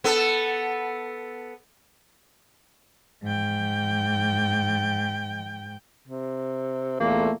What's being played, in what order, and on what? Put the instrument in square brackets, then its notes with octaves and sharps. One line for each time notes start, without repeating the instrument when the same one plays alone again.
[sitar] B3 A4
[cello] G#2 G5
[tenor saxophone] C3
[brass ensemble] E2 A#2 A3 [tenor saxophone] A#3